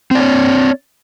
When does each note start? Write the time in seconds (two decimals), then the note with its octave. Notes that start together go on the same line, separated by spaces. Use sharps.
0.11 C4
0.15 D5
0.19 C#5